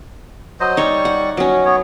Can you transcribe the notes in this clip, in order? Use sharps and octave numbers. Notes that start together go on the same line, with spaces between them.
F#3 C5 D#5
G3 D#4 C#5 C#6
F#5
F#3 C#4 D#5
B3 C#5